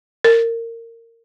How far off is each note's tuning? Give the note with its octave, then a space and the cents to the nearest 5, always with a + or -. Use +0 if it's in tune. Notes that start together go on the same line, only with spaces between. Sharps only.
A#4 -20